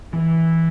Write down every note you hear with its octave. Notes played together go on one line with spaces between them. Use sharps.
E3